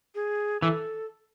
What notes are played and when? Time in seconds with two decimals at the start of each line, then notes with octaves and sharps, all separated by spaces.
0.15 G#4
0.62 E3 A4